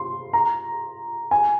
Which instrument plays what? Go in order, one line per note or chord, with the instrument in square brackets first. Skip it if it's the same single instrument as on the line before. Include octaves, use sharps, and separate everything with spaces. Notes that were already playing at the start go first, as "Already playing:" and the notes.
Already playing: [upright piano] C6
A#5
G#5